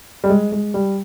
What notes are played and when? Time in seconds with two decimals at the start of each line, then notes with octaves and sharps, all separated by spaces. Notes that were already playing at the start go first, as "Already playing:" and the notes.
0.24 G3
0.30 G#3
0.52 G#3
0.74 G3